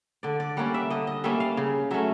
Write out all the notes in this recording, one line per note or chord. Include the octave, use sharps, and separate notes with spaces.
D3 D5
D5
G3 A#3 C#4 F#5
E5
D3 D#5
D#5
G3 A#3 C#4 E5
F5
C#3
F#3 A3 C#4 E5